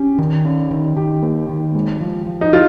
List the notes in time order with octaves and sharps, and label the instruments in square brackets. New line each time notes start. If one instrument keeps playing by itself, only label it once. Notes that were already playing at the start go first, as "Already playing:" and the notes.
Already playing: [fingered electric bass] C#4 [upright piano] G4
[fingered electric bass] D#3
C#4
D#3
[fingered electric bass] D#3 [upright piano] G4
[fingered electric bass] A#3
D#3
G#3
F3
F3
[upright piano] D#4
[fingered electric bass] F3 [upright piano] F4